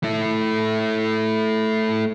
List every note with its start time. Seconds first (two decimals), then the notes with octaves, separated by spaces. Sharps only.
0.03 A3 E4